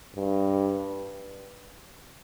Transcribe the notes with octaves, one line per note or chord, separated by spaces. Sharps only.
G2